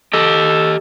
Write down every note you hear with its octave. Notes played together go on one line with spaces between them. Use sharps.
G4 A4 D#5